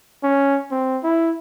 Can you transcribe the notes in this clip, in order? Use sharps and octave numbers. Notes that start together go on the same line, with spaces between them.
C#4
C4
E4